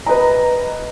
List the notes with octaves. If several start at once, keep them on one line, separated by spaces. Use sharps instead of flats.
B4 D#5 A#5